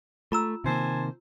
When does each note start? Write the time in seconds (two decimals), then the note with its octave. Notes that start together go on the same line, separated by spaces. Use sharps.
0.32 A3 F4 A#5 E6
0.64 C3 D#3 A#3 C5 G#5 A5